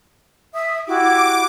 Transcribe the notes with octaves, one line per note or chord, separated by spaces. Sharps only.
E5 D#6
E4 F#4 G4 D6